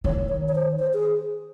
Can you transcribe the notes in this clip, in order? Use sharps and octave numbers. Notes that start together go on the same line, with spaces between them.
D#3 C#5
C#5
C#5
C5
C5
G#4